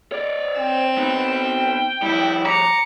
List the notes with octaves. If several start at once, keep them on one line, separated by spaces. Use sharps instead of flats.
C#5 D5
C4 G5 E7
B3 D#4
F3 G3 E4
A#5 D6 C#7